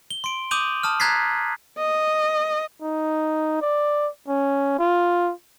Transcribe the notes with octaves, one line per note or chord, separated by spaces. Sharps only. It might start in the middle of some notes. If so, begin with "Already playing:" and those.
G7
C6 D7
D6 D#6 G6 D#7 F7 F#7
A5 D#6 F6
A#5 F#6 G#6 A6 B6 C7
D#5
D#4
D5
C#4
F4